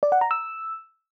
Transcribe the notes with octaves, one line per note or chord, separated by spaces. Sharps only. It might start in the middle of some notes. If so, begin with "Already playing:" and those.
D5
F#5
A#5
E6